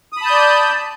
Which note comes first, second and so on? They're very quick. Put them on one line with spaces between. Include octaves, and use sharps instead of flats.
D#6 B5 A5 G6 D5